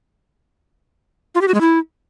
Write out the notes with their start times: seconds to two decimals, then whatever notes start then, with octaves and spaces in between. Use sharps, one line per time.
1.35 F4
1.41 G4
1.48 F#4
1.54 G#3
1.61 E4